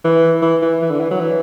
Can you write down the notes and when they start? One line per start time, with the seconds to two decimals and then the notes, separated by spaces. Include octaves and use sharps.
0.04 E3
0.42 E3
0.62 E3
0.82 E3
0.91 D3
1.00 E3
1.11 F#3
1.20 E3